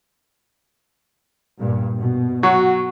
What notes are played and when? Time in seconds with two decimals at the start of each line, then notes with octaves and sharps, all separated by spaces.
1.58 G2 A#2
1.99 B2
2.43 F#3 F#4